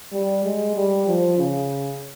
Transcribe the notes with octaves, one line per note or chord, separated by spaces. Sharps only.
G3
G#3
G3
F3
C#3